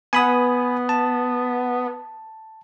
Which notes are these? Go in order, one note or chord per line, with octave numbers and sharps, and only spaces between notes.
B3 G#5 B5 D#6
A5